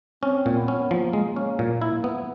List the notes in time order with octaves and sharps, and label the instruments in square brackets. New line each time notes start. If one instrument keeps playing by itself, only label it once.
[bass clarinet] C4 [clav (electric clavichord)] C#4
[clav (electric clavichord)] A#2
[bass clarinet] B3
[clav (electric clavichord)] C#4
[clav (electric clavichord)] F3 [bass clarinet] A#3
[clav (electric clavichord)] G#3
[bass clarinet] A#3
[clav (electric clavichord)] C#4
A#2
E4
B3